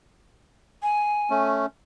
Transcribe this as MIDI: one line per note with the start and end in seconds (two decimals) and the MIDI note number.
0.83 1.47 80
1.30 1.66 57
1.30 1.66 61